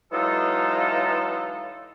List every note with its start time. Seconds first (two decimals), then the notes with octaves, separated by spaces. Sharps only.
0.12 E3 F#3 G#3 D#4 F4 A4